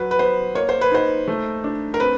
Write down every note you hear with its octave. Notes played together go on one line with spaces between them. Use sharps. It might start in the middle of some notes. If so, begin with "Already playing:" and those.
Already playing: F#3 B4
B4
B3 C5
A#3 C#5
C5
B4
D#4 C5
A3
D4
A#4
C4 B4